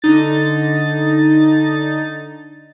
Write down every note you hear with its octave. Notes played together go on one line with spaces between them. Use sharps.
D3 D#4 A6